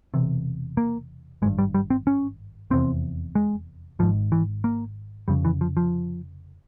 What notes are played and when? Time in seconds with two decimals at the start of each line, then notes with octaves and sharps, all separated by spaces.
0.14 E1 E2 C3
0.77 A#3
1.42 G#1 G#3
1.46 G2
1.58 G3
1.74 G3
1.90 C4
2.07 C#4
2.71 F1 E2 C3 C4
3.35 G#3
3.99 G#1 G#2 F3
4.32 E3
4.64 A#3
5.28 F1 F2 C#3 G3
5.45 E3
5.61 F3
5.77 F3